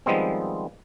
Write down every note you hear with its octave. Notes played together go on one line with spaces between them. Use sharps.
D#3 F3 G3 G#3 B3 C4